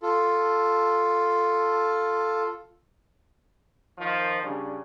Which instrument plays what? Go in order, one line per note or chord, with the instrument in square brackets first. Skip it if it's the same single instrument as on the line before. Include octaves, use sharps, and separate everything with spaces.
[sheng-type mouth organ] F4 A4
[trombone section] D#3 F3
C#3 G3 D4